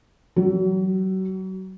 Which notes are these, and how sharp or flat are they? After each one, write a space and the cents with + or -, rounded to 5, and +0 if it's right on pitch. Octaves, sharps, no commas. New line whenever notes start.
F#3 +35